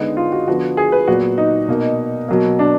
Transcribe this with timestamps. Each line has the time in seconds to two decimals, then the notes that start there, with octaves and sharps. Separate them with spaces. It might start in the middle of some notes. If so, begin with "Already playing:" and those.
Already playing: D3 G#3 B3 D#4
0.17 F4
0.32 F#4
0.47 D3 F3 B3 F#4
0.77 G#4
0.92 B4
1.08 A#2 F#3 B3 F#4
1.38 D#4
1.68 B2 A#3
2.28 B2 F#3 A#3
2.59 D4